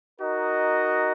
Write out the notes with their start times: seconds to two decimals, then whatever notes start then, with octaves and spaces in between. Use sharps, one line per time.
0.21 D#4 F#4 A#4 D#5